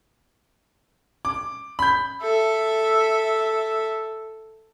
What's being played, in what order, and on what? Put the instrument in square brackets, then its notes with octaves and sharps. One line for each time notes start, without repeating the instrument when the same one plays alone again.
[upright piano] D6
B5 G6
[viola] A4 E5